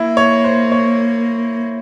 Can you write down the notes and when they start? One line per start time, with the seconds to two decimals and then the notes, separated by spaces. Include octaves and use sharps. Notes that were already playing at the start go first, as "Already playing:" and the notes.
Already playing: A#3 E4
0.17 C#5
0.44 C5
0.72 C#5